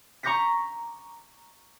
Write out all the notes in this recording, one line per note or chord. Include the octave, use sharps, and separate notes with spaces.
A#5 C#6 D6 G6 A#6 B6